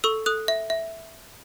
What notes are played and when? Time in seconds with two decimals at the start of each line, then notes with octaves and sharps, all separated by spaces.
0.04 A4 C#6 E6
0.26 A4 D#6 F#6
0.48 E5
0.70 E5